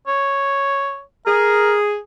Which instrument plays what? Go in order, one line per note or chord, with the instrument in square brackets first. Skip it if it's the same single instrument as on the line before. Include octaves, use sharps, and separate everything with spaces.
[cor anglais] C#5
[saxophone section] G#4 [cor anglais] A#4